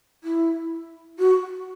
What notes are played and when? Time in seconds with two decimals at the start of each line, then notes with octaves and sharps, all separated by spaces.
0.23 E4
1.18 F#4